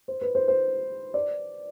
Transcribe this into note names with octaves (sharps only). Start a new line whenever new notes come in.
C5
B4
C5
C5
D5